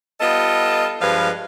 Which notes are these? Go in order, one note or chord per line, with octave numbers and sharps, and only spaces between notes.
G3 B3 F4 A4 D#5
G2 F3 G#3 B4 D5 F5